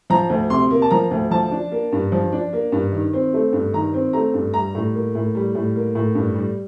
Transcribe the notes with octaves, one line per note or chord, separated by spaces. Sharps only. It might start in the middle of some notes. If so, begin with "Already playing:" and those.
F3 A#5
D2
C3 C6
A#3
A5
F3 A#5
D2
F3 A5
D4
A#3
G2
F3
D4
A#3
G2
D#3
C4
A3
G2
D#3 A#5
C4
A3 A#5
G2
G3 A#5
A2
A#3
A2
G3
A2
A#3
A2
G2
G3